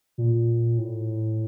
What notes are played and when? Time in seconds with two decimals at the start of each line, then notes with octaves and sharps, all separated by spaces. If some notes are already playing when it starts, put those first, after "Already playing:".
0.18 A#2
0.78 A2